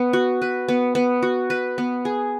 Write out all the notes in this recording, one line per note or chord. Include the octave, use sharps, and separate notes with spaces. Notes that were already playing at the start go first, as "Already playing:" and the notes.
Already playing: B3
F#4
B4
B3
B3
F#4
B4
B3
G#4